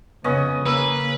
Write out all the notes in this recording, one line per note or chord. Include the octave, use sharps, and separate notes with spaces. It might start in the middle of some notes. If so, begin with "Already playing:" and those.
F2 C#3 B3 C#4 D#5
C#3 A#3 B4 E6